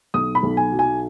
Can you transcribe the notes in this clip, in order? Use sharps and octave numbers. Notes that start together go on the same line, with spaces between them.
B1 D#6
B5
B1
G#5
F#3
G#5